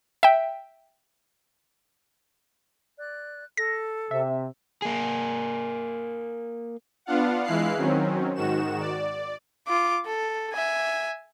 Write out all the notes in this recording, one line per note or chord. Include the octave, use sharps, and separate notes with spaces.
E5 G5
D5 F#6
A4 A#6
C3 E5
A#3 G#4
B3 D4 F4 F5 F#5
E3 G#3 E4 F5 F#6 C7
D#3 F#3 C4 C#4
G#2 D#3 F#4 E7
D5
F4 D6
A4
E5 G#5